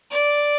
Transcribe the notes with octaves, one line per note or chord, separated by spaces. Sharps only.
D5